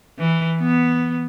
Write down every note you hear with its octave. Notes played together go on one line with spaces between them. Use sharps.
E3
B3